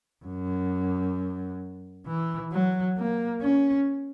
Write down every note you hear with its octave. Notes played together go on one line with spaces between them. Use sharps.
F#2
E3
F#3
A#3
C#4